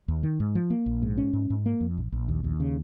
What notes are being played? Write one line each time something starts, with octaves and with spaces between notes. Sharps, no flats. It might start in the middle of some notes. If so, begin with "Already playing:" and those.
D#2
D#3
G#2
F3
A#3
A#1
G#2
C#4
G#2
G#2
A#3
F2
A#1
A#1
D#2
D#2
C#3